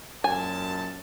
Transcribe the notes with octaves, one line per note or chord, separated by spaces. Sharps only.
F#2 A#2 G#5 A5